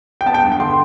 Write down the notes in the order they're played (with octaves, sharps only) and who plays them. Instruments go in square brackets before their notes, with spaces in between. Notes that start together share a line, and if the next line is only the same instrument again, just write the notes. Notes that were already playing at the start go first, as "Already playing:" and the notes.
[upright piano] G5
B3 A5
G5
G2
G5
D3 C6